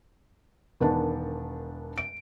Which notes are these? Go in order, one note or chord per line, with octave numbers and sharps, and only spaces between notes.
E1 D#3 B3 D4 A5
D7